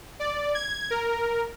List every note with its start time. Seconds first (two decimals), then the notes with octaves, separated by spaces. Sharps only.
0.20 D5
0.55 G#6
0.90 A#4